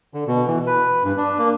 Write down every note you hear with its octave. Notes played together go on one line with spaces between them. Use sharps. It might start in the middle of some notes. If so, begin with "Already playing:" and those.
D3
B2
E3
B4
G2
D4
A#3